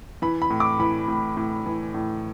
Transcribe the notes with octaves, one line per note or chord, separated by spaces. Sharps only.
E3 B5
B5
A2
D6
E3 B5
A2
A2
E3
A2